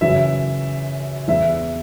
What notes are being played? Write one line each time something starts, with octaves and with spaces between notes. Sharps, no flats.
F#2 C#3 E3 E5
E2 E3 E5